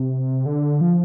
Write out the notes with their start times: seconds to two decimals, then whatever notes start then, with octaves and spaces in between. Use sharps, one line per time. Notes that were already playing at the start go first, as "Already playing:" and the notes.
Already playing: C3
0.46 D3
0.81 F3